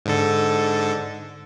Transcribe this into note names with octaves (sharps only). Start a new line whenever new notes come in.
G#2 D3 A4